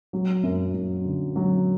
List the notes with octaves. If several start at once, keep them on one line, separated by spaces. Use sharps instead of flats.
F#3
F#2
F#2
D3
F#3